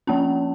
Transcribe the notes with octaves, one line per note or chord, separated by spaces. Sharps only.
F3 A#3 C#4 A5